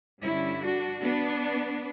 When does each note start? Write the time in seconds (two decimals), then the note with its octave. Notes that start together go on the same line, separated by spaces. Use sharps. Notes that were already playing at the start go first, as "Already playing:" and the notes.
0.23 G2 D3 G3 C#4 E4
0.62 D4 F#4
1.02 B3 D4